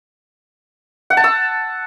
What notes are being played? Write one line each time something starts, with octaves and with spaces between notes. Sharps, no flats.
F#5
A5
E6